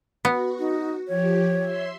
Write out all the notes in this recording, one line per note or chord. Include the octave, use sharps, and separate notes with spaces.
B3 F#4
D#4
F3 G4 C#5
E5 C6